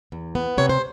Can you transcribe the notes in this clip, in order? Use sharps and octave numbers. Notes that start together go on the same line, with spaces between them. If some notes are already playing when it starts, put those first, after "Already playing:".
E2
B3
C3 C#5
C5